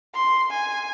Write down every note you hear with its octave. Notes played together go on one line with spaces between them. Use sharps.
C6
G#5